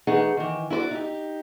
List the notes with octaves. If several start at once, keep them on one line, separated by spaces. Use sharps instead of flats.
E3 A3 D#4 G#4 F#5
D#3 E3
E4 F#4 B4 D5
D#4 G4